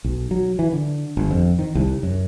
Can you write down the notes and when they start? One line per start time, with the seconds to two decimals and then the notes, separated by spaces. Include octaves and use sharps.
0.04 B1
0.31 F#3
0.59 E3
0.72 D3
1.17 G1
1.31 F2
1.59 D#3
1.75 C2
2.03 F#2